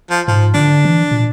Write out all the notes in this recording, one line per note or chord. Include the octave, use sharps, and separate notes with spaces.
F3
G#2 F3
D3 D4
E3
A#2